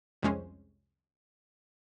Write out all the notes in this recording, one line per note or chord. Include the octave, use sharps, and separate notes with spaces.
C2 F2 G#3 C#4 C5